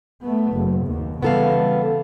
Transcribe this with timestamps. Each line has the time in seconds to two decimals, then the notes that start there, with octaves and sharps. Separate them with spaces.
0.22 A3 B3
0.54 F#1
0.85 D#2
1.23 C#3 E3 G3 B3 A4 F5